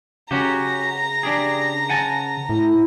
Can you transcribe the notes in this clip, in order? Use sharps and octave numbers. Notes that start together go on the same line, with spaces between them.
C#3 C#4 F#4 G4 A#5
D4 G4 G#4
F#5 G#5 A5
A2 E4